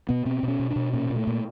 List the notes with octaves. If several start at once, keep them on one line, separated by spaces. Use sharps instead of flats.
B2 B3
B2 C4
B2 C#4
B2
D4
B2
A#2 C#4
A#2
A3
A#2